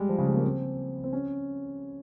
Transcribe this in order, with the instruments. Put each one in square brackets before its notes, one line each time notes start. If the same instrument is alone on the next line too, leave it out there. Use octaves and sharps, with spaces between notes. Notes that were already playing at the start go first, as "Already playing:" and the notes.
Already playing: [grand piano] G3 G#3
F3
C#3
G#3
A#3
C4
C4
C#4